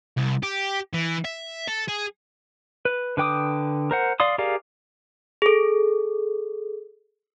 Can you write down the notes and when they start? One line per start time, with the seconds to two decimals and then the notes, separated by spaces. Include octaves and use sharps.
0.17 C2
0.43 G4
0.93 E3
1.25 E5
1.67 A4
1.88 G#4
2.85 B4
3.17 D3 B4 G5 D6 D#6
3.91 A#4 C5 F#5
4.20 D5 F5 C6 D#6
4.38 G4 G#4 A#4 D5 F5
5.42 G#4 A4